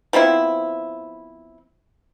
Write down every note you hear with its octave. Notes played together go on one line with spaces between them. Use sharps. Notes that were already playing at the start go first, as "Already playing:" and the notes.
F3 B3 C4 E4